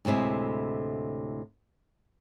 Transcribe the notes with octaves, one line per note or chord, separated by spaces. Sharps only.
D2 A2 C3 G#3 E4